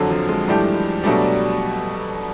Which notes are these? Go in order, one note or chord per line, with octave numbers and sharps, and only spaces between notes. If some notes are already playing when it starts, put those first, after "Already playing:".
Already playing: F2 D3 F#3
F3
G#3
G2 E3 A3 D4 G4
B2 F#3 G3 A3 D4